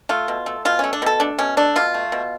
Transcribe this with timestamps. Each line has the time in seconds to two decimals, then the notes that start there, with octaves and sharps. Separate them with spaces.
0.09 A3 F4
0.28 B2
0.46 A3
0.65 B2 F4
0.79 A3 C#4
0.93 D4
1.02 B2 A4
1.20 A3 D4
1.38 B2 C#4
1.57 A3 D4
1.76 B2 F4
1.94 A3
2.12 B2